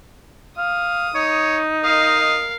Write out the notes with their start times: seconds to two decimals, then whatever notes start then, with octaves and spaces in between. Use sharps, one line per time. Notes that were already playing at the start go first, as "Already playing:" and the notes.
0.58 F5 D#6
1.15 D#4 C#5
1.83 A#4 D#5 F5